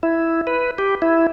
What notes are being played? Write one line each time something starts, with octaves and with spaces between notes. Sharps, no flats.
E4
B4
G4
E4